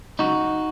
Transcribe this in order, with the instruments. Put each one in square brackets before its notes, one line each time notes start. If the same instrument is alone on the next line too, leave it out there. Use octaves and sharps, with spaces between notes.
[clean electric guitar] C#2 C#3 F#3 D#4 F#4